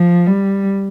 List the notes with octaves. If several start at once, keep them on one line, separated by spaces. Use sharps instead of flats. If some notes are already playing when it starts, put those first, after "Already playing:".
Already playing: F3
G3